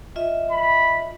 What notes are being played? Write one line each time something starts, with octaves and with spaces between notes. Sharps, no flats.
F4 D#5 E5
B5